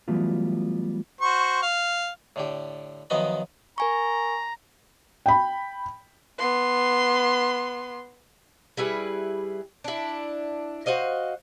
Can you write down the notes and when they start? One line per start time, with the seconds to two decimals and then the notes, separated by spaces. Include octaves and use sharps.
0.08 E3 F#3 G3 A3 B3 F4
1.21 F#4 C5 C#6
1.62 F5
2.36 A2 D3 G4
3.10 F#2 D#3 F3 B3 D#5 B5
3.78 A#4 G#5 A#5 C#6
5.26 G5 B5
6.39 B3 C6
8.77 G3 E4 G#4 B4
9.84 D4 E4
10.86 F#4 C5 D#5 F5